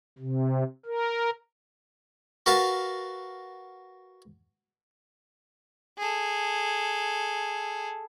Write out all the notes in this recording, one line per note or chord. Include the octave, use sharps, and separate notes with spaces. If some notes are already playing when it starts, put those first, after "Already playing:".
C3
A#4
F#4 A#4 B4 F5 A5
G#4 A4